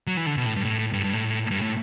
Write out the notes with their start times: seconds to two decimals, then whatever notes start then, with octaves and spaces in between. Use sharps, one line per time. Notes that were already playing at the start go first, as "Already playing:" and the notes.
0.07 F#3
0.17 E3
0.26 D3
0.37 B2
0.46 A2
0.56 G2
0.65 A2
0.93 G2
1.04 G2
1.13 A2
1.51 G2
1.62 A2